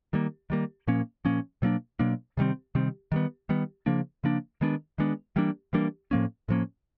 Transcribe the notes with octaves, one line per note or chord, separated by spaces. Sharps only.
D#3 G3 A#3
D#3 G3 A#3
A#2 F3 A#3 C#4
A#2 F3 A#3 C#4
B2 F#3 A#3 D4
B2 F#3 A#3 D4
C3 D#3 G3 C4
C3 D#3 G3 C4
D#3 G3 B3
D#3 G3 B3
C#3 F3 A#3 D4
C#3 F3 A#3 D4
D#3 G#3 B3 D4
D#3 G#3 B3 D4
E3 G3 A#3 D4
E3 G3 A#3 D4
A2 F3 A#3 C#4
A2 F3 A#3 C#4